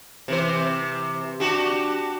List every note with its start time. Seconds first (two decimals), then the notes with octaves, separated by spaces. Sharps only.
0.28 C3 E3 C5
1.40 D4 F#4 G4